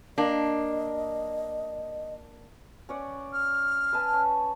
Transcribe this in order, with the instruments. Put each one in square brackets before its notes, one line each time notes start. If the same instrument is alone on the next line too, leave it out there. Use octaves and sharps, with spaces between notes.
[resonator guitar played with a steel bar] A#3 D4 [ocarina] D#5
[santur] C#4 D5 F#5
[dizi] F6
[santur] B4 G#5 A5
C#4